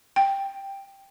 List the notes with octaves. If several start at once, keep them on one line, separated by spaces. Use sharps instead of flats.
G5